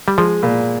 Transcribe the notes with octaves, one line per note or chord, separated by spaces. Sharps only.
G3
F3 G#3
A#2